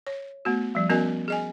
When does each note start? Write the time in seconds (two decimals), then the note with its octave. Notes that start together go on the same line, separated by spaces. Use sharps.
0.07 C#5
0.45 A3 B3 F#4
0.75 F3 G3
0.90 B3 C#4 F#4 A#4 D#5 G#5
1.28 G#4 D#5 G#5